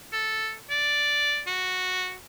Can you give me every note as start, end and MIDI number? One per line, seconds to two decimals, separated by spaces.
0.13 0.55 69
0.70 1.42 74
1.47 2.15 66